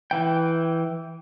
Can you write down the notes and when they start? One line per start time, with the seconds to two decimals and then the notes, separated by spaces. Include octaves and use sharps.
0.11 E3 G5